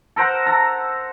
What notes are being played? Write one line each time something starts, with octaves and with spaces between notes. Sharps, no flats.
A4 A#4 C5 F#5
A4 A#5